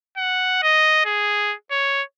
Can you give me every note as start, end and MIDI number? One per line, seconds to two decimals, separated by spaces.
0.17 0.59 78
0.63 1.05 75
1.05 1.55 68
1.71 2.03 73